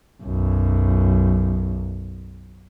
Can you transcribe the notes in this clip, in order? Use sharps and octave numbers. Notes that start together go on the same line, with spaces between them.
B1 F#2